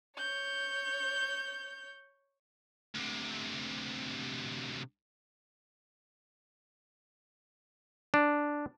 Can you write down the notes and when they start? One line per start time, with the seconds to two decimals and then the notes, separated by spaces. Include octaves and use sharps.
0.18 C#5 G6
2.95 D2 C3
8.14 D4